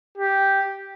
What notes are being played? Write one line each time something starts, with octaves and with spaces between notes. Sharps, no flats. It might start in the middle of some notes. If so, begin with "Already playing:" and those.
G4